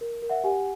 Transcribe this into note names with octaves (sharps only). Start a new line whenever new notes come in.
A#4
A#4
E5 F#5
G4 F#5 G#5